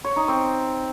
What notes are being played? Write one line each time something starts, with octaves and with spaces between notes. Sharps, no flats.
C#5
D#4
C4